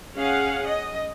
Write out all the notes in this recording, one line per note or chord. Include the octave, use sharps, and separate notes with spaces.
C#4 G#4 F5 F#5
D#5